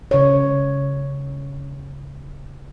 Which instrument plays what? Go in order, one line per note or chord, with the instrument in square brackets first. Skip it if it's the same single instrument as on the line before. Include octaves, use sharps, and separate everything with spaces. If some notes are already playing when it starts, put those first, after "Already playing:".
[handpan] C#3 C#5